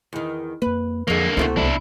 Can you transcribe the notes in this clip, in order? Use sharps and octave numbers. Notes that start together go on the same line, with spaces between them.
E2 D#3
F2 A#3 B4
F2 D3 F3 F#3 G#3 A#3
C#2 C3 A3 B3 E4 F#4
C2 D4 E4